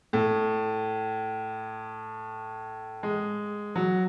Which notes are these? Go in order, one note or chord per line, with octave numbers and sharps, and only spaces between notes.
A2
G#3
F#3